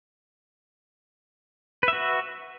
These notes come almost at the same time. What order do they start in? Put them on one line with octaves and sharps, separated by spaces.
B4 E5 F#4